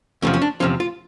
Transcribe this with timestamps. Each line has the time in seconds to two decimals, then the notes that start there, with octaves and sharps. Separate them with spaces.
0.22 E2 C3 F3 C#4
0.34 C#4
0.42 D4
0.60 E2 C3 F3 C#4
0.80 F4